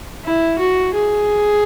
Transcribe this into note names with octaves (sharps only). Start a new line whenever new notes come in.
E4
F#4
G#4